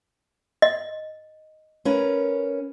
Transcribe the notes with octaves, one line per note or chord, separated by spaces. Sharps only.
D#5
C#4 A#4 B4